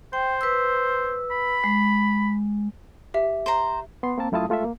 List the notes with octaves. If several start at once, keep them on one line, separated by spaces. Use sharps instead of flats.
C5 G5
B4 E6
B5
G#3
G4 E5
C5 A#5
B3 C6
A#3 C4 A#4 A5
F#2 A3 E4 F4 A5 D#6
G#3 A3 F4 A4 E5
A#3